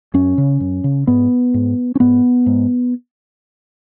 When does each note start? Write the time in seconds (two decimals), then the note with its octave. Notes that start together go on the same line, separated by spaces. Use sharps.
0.14 F#2 C#4
0.38 C#3
0.60 F#2
0.84 C#3
1.07 G#2 B3
1.54 G#2
1.95 C#4
2.00 G#2 B3
2.46 G#2